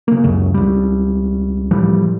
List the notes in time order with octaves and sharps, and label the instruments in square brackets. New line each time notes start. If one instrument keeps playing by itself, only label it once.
[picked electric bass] C#3 A#3
C#2 F#2 C#3
C#2 G3
A2 E3 F3 G3